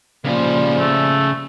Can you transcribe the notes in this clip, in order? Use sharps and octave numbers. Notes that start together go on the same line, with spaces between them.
A#2 C#3 F3 G3 C5
A3